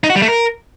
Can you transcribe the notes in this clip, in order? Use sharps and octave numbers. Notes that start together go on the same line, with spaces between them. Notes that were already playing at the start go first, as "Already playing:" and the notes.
D#4
F#4
G3
A3
A#4